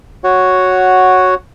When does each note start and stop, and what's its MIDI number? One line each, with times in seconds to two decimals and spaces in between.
0.24 1.34 66
0.24 1.34 73
0.24 1.34 78